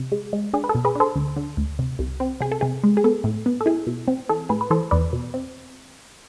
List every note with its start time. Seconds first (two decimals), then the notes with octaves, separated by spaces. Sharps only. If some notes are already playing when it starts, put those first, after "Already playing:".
Already playing: C3
0.12 G#3
0.33 G#3
0.54 D4 G#4
0.64 B4
0.69 A4
0.75 B2
0.85 G#4 B4
0.95 D4 A4 C5
1.16 D2
1.36 D3
1.57 D2
1.79 C3
1.99 C2
2.20 C4
2.41 C3 G#4
2.52 A4
2.61 C3 G#4
2.83 G#3
2.97 G#4
3.04 B3 A4
3.24 A2
3.46 B3
3.61 A4
3.66 E4 G#4
3.87 B2
4.08 C4
4.29 E3 A4
4.49 A2 G#4 B4
4.61 B4
4.70 E3 A4 C5
4.91 E2 B4 D5
5.13 B2
5.34 C4